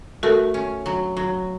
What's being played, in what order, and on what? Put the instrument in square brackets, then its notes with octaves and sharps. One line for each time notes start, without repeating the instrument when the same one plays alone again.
[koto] A3 [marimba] F#4 A#4
[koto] C#4
F#3
F#3